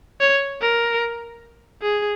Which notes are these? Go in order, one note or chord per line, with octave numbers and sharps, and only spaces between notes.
C#5
A#4
G#4